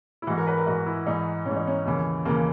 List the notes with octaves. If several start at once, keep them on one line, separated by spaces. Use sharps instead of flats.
E4
G#2 E3 F#4
A#4
B4
A#4
G#2 E3 F#4
E4
G#2 E3 D#4
G#2 E3 C#4
D#4
C#4
D#2 C#3 E3
D#2 C#3 E3 A#3